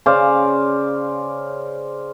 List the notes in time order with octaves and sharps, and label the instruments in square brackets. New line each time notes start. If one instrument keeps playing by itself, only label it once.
[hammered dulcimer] C#3 C5 D5 F5